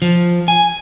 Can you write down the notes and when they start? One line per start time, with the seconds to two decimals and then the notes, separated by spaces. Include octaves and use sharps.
0.02 F3
0.48 G#5